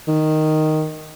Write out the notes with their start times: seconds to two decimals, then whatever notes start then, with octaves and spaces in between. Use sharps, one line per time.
0.08 D#3